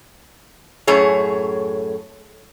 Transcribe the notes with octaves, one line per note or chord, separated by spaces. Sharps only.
F#2 A2 G#4 C#5